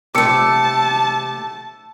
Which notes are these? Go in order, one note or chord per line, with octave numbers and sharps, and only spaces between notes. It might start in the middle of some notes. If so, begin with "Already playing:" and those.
C3 A3 A5 D6 E6 C#7